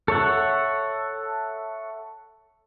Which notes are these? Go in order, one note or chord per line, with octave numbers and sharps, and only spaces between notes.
A4 C#5 E5 F#5